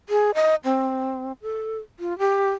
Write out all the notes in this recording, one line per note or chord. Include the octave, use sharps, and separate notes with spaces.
G#4
D#5
C4
A4
F4
G4